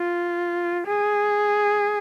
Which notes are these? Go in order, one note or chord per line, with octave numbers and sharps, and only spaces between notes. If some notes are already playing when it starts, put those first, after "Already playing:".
Already playing: F4
G#4